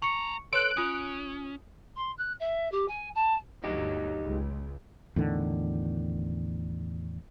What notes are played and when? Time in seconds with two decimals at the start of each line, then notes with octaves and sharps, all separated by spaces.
0.02 A3 A#5 C#6 C#7
0.53 A4 B4 C#5 C6 F#6 D7
0.77 C#4 F4 D#6
1.96 C6
2.18 F#6
2.39 E5
2.72 G4
2.88 G#5
3.15 A5
3.64 G1 D2 F#3 D#4 G4
4.20 C#2
5.16 E2 A2 D3 D#3